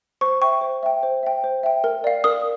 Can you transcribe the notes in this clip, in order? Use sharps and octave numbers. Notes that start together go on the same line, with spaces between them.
C5 C#6
E5 G5 C#6
C5
E5 G5
C5
E5 G5
C5
E5 G5
A#4
D5 F5
A#4 D#6